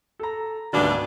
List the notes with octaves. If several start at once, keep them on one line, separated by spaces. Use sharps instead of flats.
A4 A#5
G#1 D2 G2 B2 D4